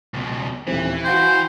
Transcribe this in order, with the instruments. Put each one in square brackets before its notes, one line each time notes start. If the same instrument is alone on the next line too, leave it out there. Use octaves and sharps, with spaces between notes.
[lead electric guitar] C#2 B2
[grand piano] D#1 C4 [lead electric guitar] E3
[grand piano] F#4 F5 G5 [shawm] C5